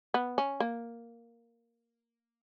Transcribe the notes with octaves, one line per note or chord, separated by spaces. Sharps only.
B3
C#4
A#3